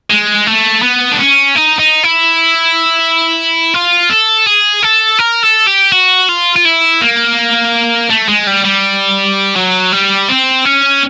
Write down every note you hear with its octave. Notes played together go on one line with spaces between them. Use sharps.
G#3
A3
B3
D4
C#4
D#4
D#4
E4
F4
A4
G#4
A4
A#4
A4
G4
F#4
F4
F4
E4
A#3
A3
G#3
G3
G3
F#3
G3
C4
C#4